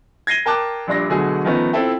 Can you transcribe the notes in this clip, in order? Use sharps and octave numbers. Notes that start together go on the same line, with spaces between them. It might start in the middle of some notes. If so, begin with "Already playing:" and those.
G#6 A#6 C7 D#7 G7
A#4 G5 A5 D6 F#6
A#1 G2 D4 C6 A#6
B2 D3 F#3 A3 G#4
D#3 F3 A3 B3 C#4 D#4
C4 E4 F4 A4 E5 G5